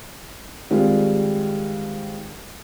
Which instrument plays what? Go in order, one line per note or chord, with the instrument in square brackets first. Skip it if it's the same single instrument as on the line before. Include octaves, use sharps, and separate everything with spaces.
[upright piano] D#3 G3 G#3 C4 D4 F4